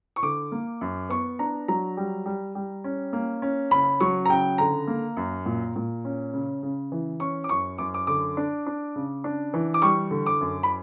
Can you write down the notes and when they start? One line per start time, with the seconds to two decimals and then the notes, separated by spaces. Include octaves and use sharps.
0.16 C#6
0.22 D3 D6
0.52 A#3
0.81 F#2
1.09 B3 C#6
1.39 D4 A#5
1.68 F#3 A#5
1.97 G3
2.26 G3
2.55 G3
2.84 C#4
3.13 A#3
3.42 C#4
3.71 C#3 B5
4.00 F#3 C#6
4.26 A#5
4.29 C#3 G5
4.58 D3 A#5
4.88 A#3
5.17 F#2
5.46 A#2
5.76 A#2
6.05 C#4
6.33 C#3
6.63 C#3
6.92 E3
7.20 C#4 C#6
7.44 D6
7.49 F#2 C#6
7.78 F#2 D6
7.94 D6
8.07 D3 D6
8.37 D4
8.66 D4
8.96 C#3
9.24 D4
9.54 E3
9.74 D6
9.82 G3 C#6
10.11 D3
10.26 D6
10.41 F#2
10.63 B5